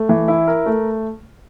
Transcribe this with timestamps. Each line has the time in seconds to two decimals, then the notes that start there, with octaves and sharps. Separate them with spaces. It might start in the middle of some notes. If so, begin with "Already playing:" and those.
Already playing: A3
0.09 E3
0.28 E4
0.47 A#4
0.66 A3